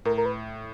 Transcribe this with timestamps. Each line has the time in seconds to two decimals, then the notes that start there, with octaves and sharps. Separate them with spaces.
0.05 A2 A#4
0.18 A#4
0.26 B4